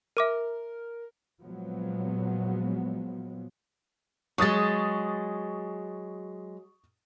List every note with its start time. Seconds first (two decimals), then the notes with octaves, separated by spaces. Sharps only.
0.17 A#4 E5 D6 D#7
1.43 A#2 F3 F#3 G#3 B3
4.38 F#3 G#3 C#6 D#6 A6